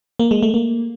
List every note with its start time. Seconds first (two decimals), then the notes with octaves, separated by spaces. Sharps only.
0.19 A#3
0.31 G#3
0.43 A3
0.54 A#3